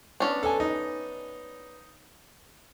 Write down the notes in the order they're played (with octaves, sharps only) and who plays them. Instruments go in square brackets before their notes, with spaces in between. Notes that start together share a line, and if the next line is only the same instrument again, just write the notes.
[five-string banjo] B3 C#4 D4
[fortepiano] A4 G#5
D#4